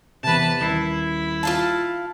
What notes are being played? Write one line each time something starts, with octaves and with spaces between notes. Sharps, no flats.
E2 C3 B4 A5
D#1 E4 C7
F4 F5 A5